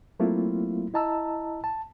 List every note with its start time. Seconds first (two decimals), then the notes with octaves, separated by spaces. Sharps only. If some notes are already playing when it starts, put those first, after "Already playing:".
0.20 F#3 A3 A#3 C4 E4 F4
0.94 E4 D#5 A5 A#5 E6
1.64 A5